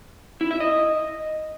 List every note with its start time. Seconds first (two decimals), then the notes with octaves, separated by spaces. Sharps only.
0.41 E4
0.51 E5
0.60 D#5